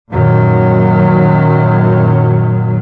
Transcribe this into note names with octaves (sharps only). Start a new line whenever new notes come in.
F#2 A#2 D#3 F#3